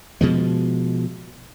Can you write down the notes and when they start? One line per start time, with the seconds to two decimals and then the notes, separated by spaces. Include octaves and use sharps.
0.21 B2 F3 G#3